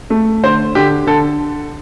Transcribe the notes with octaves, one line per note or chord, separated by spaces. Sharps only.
A3
D3 C5
D3 G4
D3 A4